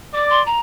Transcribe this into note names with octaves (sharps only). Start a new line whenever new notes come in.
D5 D6
C6
A#5